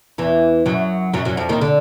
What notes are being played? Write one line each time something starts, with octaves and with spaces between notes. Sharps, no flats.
E2 E3
F#2 F#3
F#2 F#3
F#2 F#3
F2 F3
D#2 D#3
D3